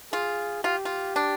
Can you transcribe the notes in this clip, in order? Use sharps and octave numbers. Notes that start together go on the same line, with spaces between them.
F4 G#4
F4 G4
F4
D4